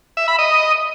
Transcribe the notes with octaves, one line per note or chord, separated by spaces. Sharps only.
E5
B5
D#5